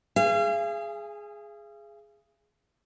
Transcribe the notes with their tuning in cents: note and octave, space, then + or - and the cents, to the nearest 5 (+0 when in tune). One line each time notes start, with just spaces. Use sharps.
G#4 +0 F5 -45 G#5 -30